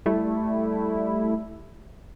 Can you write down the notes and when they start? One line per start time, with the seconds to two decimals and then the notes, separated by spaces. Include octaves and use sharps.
0.06 G3 A3 E4